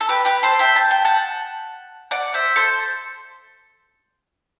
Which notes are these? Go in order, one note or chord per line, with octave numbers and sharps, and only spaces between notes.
A4
G4 B4
G4 B4
A4 C5
E5 G5
A5
G5
F#5 A5
D5 F#5
C5 E5
A4 C5